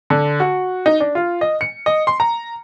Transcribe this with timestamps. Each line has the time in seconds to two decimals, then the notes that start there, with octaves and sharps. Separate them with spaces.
0.10 D3
0.40 F#4
0.86 D#4
1.00 D4
1.15 F4
1.41 D#5
1.61 C#7
1.86 D#5
2.07 C6
2.20 A#5